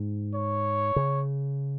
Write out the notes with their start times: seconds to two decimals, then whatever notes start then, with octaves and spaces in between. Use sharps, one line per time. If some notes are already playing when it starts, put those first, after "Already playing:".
Already playing: G#2
0.35 C#5
0.96 C#3